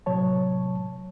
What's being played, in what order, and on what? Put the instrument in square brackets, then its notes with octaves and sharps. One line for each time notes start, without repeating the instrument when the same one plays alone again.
[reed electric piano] A2 C3 F#3 C#5 A5